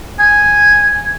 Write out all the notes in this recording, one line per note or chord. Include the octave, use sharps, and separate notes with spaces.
G#5